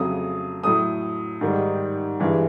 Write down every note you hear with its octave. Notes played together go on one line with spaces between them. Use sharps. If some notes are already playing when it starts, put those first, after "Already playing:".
Already playing: F2 C#3 F#3 A3 D#6
A2 F#3 A3 D#6
G#2 D#3 G3
G2 E3 G#3